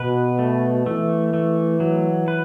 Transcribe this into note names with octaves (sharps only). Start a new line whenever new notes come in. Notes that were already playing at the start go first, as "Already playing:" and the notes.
Already playing: B2 B4
A3
E3 A3
A3
F#3
B4